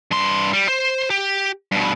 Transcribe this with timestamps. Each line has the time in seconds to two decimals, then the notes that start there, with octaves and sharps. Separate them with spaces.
0.11 G2 C6
0.53 G3
0.68 C5
1.10 G4
1.72 G2 B2